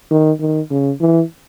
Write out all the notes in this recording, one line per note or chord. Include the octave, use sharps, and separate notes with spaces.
D#3
D#3
C#3
E3